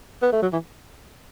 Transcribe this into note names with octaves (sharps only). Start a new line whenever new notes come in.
B3
A3
F#3
E3